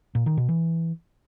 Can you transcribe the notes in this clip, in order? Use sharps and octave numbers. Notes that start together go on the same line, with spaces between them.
A#2
D#3
B2
E3